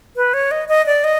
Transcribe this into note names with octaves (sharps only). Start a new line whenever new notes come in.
B4
C#5
D#5
D#5
D5
D#5